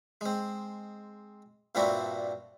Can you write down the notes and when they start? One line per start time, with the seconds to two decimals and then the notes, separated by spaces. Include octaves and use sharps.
0.21 G#3 C4
1.75 G2 A#2 C4 D4 E4 F#4